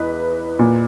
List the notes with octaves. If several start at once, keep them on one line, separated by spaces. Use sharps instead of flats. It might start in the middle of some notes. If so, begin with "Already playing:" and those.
Already playing: E2 B4 D#5
A#2